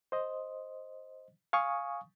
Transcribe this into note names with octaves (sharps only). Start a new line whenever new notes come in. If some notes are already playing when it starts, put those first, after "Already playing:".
C5 D#5
F5 G#5 C#6 D#6